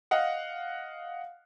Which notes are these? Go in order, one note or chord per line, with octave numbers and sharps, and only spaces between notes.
D#5 F5 F#5